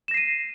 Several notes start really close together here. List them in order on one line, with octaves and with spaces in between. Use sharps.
E7 A#6 C7 D#7